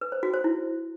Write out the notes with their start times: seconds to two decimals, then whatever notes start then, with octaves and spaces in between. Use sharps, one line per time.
0.01 B4
0.12 C5
0.23 F#4
0.34 C5
0.44 E4